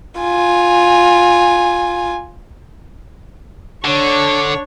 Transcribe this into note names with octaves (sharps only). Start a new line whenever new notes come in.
F4 G#5
D3 D4 C#5